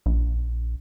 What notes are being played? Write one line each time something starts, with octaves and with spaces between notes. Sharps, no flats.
A#1